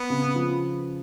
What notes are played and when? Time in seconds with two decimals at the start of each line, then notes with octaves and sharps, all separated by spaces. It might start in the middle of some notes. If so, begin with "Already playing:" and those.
Already playing: B3
0.10 C#3
0.35 F3